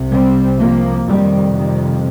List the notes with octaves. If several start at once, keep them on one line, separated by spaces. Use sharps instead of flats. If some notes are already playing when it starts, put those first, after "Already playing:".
Already playing: C2 C3
G3 C4
F3 A#3
F2 C3 D#3 G3
D#3 G3